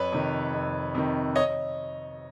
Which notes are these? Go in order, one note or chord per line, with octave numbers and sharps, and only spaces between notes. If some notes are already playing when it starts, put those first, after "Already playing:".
Already playing: F2 B4 C#5
C3 D#3
F2
C3 D#3
C#5 D#5